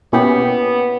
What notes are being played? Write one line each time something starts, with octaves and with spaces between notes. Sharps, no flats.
B2 A#3 B3 C#4 E4 G4